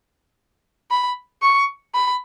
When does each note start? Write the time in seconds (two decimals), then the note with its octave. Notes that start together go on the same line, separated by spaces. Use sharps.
0.91 B5
1.42 C#6
1.94 B5